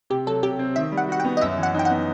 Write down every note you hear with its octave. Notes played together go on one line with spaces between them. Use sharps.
C3 G4
F#3 A4
C3 G4
C4
D#3 E5
G3
F#5
F#4 F#5
G5
B3
D#5
F#2 E5
E3
F#5
D#4 G5
F#5
B3